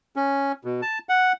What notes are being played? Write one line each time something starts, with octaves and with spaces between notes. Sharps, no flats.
C#4
B2
A5
F#5